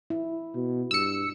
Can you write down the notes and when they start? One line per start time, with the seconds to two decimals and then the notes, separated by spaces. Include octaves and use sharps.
0.10 E4
0.55 B2
0.91 G2 E6 C#7